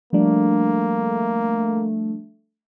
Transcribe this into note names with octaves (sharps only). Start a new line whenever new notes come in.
F3 G3 A3 A#3 D4